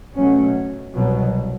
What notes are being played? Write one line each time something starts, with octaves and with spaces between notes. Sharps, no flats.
B2 F#3 A3 C#4
C2 B2 F#3